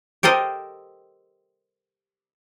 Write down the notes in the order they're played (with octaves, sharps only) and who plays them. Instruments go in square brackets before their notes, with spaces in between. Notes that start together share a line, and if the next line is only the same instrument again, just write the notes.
[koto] G4 A4 A#4 C5 D#5